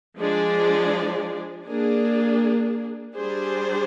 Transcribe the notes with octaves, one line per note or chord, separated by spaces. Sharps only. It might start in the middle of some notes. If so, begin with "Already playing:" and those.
F3 G#3 D4 G#4 D5
A#3 D4 G#4
G3 D4 G#4 C5